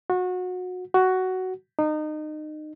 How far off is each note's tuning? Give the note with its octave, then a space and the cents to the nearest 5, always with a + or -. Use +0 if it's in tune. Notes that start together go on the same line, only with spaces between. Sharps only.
F#4 -25
F#4 +10
D#4 -25